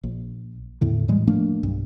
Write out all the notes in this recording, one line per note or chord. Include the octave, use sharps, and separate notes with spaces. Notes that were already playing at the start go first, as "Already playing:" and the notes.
A#1
E2 A2 D3
A2 E3 G3 G#3
F3 A3 A#3 D4
B1 G2